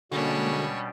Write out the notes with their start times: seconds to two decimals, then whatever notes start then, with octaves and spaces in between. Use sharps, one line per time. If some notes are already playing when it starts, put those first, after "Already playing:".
0.11 B2 D3 G3 G#3 A#3 C#4 D4 F#4